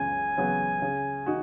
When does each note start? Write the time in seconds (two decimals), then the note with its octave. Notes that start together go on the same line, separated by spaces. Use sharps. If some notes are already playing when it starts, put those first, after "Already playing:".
Already playing: C#2 C#3 F#3 B3 G#5
0.38 C#3 F#3 B3
0.82 C#3
1.26 D#4 F#4